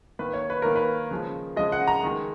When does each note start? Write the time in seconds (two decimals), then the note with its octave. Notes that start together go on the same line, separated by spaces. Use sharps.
0.19 D#3 A#3 B4
0.34 C#5
0.50 B4
0.62 D#3 A#3 A#4
0.76 B4
1.11 C#3 F3 G#3
1.56 C#3 F3 G#3 D#5
1.72 F#5
1.87 A#5
2.03 D#3 G#3